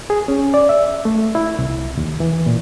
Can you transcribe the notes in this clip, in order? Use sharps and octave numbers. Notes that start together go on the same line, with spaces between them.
G#4
C#4
D5
E5
A3
E4
C2
D#2
E3
A#2